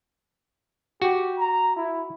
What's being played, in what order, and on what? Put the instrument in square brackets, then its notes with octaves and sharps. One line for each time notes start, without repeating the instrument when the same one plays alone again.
[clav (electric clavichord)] F#4 [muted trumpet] G4
[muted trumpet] A#5
E4